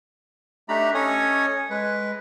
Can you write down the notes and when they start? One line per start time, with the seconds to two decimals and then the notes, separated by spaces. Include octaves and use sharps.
0.69 A3 D4 D#4 G4 A#5 B5
0.94 C#4 A4 C#5 D#5 G#5 D#6
1.70 G#3 B4